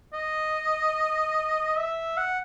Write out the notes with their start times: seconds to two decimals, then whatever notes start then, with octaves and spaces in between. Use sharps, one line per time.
0.13 D#5
1.76 E5
2.17 F#5